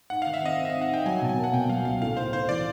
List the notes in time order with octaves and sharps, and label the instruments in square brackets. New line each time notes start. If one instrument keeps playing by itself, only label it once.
[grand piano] G#2 [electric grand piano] F#5
[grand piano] D#3 [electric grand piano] F5
[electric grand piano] E5
[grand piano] C4 [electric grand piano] D#5
[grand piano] C4
[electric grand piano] E5
[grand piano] G#2 [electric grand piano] F5
[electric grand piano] F#5
[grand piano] G#2 [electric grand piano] G5
[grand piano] F#3 [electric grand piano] G#5
[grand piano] B2 [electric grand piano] A5
[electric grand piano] G#5
[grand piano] A#3
[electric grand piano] F#5
[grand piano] B2 [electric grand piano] G5
[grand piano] F#3 [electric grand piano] F5
[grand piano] C#2 [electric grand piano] F5
[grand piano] A2 [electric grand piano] F5
[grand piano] A2 [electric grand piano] C5
[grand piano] A2 [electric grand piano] C5
[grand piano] E3 [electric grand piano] D5